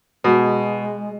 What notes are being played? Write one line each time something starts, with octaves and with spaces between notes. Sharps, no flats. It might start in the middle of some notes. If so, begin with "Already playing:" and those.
B2 G#3